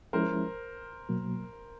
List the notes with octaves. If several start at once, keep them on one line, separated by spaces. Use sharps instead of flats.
F3 G#3 C#4 E4 A#4 C5
B2 F#3 A#3